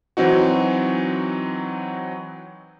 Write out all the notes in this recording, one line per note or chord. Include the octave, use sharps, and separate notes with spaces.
E3 F#3 C4 D#4 F#4